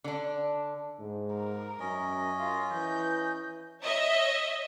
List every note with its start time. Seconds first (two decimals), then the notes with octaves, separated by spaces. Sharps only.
0.04 D3 D4
1.00 G#2
1.34 A#4
1.79 F#2 C#4 D#5
2.39 F4
2.73 E3 G6
3.81 C#5 D#5 E5